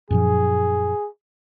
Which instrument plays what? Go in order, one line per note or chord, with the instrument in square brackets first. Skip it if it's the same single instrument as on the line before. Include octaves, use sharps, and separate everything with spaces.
[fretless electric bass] F#2 A#2 F3 [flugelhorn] G#4